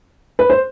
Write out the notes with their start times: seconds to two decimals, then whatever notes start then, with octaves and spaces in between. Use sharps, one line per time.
0.39 B4
0.50 C5